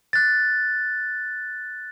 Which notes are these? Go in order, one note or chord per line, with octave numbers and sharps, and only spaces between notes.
F#6 A6